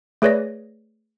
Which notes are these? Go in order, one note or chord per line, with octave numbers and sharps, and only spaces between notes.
A3 G#4 B4 C#5 D5 A#6